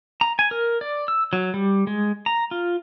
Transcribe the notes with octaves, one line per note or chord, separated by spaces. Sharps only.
A#5
G#5
A#4
D5
E6
F#3
G3
G#3
A#5
F4